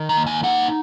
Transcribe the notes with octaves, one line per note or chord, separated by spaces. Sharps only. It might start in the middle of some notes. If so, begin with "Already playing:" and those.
Already playing: D#3
A#5
A#3
G#5
D#4 F#5